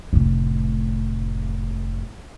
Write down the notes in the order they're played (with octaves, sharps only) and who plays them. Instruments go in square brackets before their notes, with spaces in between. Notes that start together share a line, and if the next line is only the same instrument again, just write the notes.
[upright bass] F1 A2